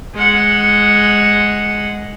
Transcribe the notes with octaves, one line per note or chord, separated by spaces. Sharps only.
G#3 F#5